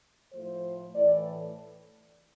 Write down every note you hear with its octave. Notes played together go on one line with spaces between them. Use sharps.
A2 F3 A3 C5
A2 E3 D5